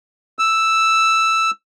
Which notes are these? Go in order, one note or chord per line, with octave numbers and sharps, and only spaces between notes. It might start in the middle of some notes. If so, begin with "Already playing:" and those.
E6